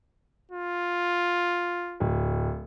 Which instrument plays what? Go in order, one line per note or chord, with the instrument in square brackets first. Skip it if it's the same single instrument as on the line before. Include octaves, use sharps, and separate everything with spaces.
[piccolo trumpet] F4
[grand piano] D1